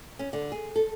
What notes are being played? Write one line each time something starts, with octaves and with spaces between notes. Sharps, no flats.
C#4
D3
G#4
A4